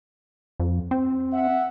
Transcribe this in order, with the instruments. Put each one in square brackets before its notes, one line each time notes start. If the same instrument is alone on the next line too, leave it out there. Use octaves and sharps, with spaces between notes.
[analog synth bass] F2
C4
[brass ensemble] E5 F#5